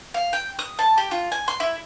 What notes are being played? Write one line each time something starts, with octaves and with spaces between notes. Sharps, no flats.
F5
G5
D#6
A5
G4
F4
G#5
C6
E4